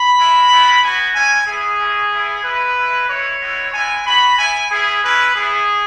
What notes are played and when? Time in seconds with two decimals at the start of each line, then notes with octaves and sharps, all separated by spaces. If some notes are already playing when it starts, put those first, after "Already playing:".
Already playing: B5
0.17 G#3 E4
0.49 G#3 B3 E4
0.82 B3 F#4 G#5
1.14 G#3 C#4 E4 G#5
1.47 B3 E4 G#4
1.79 G#3 C#4 E4
2.11 B3 E4
2.43 G#3 E4 B4
2.76 G#3 E4
3.08 G#3 E4 C#5
3.41 G#3 B3 E4
3.73 G#3 B3 E4 G#5
4.06 B3 F#4 B5
4.38 B3 E4 G#5
4.70 B3 E4 G#4
5.03 G#3 C#4 E4 B4
5.35 B3 E4 G#4